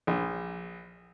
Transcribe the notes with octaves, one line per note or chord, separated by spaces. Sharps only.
A#1